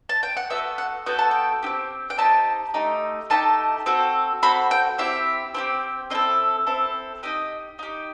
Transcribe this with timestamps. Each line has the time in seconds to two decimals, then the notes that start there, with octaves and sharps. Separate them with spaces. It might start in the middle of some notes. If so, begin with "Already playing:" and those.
0.09 A5
0.23 G5
0.37 F#5
0.50 B3 F#4 A4 E5
0.78 F#5
1.06 B3 F#4 A4 G5
1.19 A5
1.31 G5
1.63 D#4 G4
1.66 C4
2.10 G5
2.18 C4 D#4 G4 A5
2.74 A3 D#4 G4
3.30 A3 D#4 G4 A5
3.86 C4 F#4 A4
4.43 C4 F#4 A4 B5
4.71 G5
4.98 C4 E4 G4 E5
5.54 C4 E4 G4
6.10 C4 E4 A4 D#5
6.67 C4 E4 A4
7.23 D#4 G4 D#5
7.79 D#4 G4